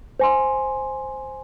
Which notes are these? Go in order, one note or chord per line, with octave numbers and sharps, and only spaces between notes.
C5 G#5 C6